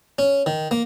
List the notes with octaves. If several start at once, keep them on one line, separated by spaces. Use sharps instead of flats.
C#4
D#3
A#3